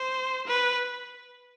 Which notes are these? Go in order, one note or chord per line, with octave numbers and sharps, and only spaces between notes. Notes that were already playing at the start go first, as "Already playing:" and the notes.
Already playing: C5
B4